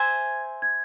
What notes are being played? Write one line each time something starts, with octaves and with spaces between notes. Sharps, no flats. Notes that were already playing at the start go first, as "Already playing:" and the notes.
Already playing: C5 E5 G#5 G#6
G#6